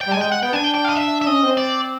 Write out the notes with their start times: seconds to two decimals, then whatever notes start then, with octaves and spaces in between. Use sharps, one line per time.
0.01 G5
0.06 G3
0.12 G#5
0.16 G#3
0.21 G5
0.32 F#5
0.43 B3 G5
0.53 D4 G#5
0.64 G5
0.75 G5
0.84 F5
0.89 D#5
0.95 E5
1.22 E5
1.27 C#4 D#5
1.42 C4
1.57 D5